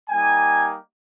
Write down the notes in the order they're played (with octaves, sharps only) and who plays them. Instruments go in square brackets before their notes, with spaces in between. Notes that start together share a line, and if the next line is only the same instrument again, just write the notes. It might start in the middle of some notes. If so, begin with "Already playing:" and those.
[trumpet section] G3 A#3 D#4 G4 G#5